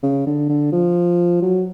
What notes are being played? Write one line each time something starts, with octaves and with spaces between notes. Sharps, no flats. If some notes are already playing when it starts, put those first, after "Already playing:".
C#3
D3
D3
F3
F#3